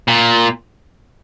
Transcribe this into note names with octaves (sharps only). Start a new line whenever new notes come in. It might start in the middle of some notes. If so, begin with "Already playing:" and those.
A#2